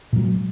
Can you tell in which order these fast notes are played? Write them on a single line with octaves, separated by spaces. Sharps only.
A#2 F#3 G#3